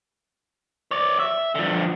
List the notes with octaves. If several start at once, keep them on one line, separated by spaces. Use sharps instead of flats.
C#5 D5
E5
D3 F3